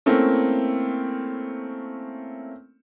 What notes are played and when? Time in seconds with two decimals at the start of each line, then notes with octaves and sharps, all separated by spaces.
0.06 A3 A#3 C4 C#4 E4